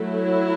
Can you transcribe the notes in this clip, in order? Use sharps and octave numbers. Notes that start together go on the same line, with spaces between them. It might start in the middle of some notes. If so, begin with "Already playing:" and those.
Already playing: F#3 A3 E4